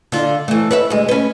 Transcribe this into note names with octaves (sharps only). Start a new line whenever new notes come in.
D3 F4
E3 A3
B4 C#5 E5
D2 G#3
C#4 B4